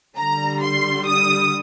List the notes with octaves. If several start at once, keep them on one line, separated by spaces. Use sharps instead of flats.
D3 G3 A#5
C6
D#6